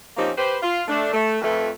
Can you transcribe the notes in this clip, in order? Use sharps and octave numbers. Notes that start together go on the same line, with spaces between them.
F3 A#3 C4 C#4 D#4 G4
G4 B4 C5
F4
A3 D4
A3
F2 A3 B4